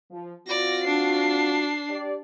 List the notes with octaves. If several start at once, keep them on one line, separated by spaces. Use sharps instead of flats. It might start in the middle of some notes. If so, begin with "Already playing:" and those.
F3
C4 F4 F#4 D5 A#6
D4 C7
G4 D5